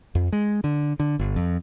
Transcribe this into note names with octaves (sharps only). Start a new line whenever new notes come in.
F2
G#3
D3
D3
G1
F2